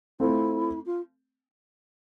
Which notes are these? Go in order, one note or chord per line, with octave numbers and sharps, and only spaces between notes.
A3 C4 E4 F4 A4
F4